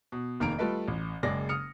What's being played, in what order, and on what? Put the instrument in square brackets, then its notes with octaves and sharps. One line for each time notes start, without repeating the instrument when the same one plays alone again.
[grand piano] B2
F1 D#3 A#3 A#4 A#5 D7
G3 A3 F4 A4 B4 D#5
A1
F#1 G#3 D5 A#6
D#6 F6 C#7